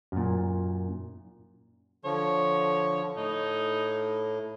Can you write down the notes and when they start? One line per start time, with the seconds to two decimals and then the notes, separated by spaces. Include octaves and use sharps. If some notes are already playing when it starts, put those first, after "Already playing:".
0.12 F#2 A#2
2.05 D3 F3 C#5
3.16 A2 D#4